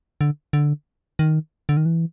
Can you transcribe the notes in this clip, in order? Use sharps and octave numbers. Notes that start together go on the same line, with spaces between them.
D3
D3
D#3
D3
D#3
E3